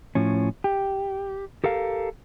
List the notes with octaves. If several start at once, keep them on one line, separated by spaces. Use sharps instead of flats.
A2 F3 C#4
G4
G4 A4 A#4 F5